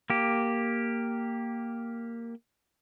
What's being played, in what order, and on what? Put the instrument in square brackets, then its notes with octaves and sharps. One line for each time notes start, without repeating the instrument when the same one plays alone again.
[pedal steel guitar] A#3 G4